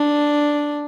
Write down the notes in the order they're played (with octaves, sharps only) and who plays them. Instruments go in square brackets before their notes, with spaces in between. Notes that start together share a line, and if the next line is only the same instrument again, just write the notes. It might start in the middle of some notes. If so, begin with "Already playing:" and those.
Already playing: [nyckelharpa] D4